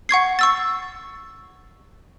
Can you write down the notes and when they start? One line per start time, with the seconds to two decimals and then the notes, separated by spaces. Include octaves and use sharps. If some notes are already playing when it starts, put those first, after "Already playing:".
0.09 F#5 C#6 G#6 C7
0.39 C#6 E6 A6